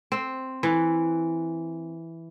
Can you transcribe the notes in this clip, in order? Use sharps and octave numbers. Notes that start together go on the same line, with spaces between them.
C4
E3